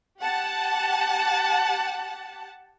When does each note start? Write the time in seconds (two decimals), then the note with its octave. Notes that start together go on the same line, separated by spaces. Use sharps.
0.20 G4 F#5 A5